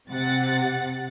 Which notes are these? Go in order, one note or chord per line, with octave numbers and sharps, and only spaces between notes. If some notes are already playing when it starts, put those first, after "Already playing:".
C3 F#5 A6